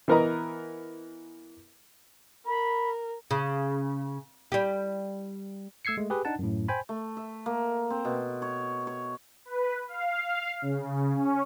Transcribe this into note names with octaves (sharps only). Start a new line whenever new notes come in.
E3 B3 A#4 B4 D#5 A#5
A#4 B5
C#3
G3 G4
A3 E6 G#6 C7 C#7
G#3 A3
G4 G#4 B4
D4 D#4 F#5 A5
F#2 A2
C5 G5 G#5 B5
A3
E5
A#3
C4
B2
C#5
C#5
B4
F5
C#3
C#4